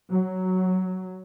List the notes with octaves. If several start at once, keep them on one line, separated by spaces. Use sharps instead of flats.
F#3